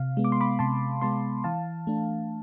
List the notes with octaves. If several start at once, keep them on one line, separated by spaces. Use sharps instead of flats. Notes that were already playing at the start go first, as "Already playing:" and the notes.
Already playing: C3 F5
G#3 B3
D6
C6
B5 D6
C3 A5 C6
G#3 B3 A5 C6
E3 F5 A5
A3 D4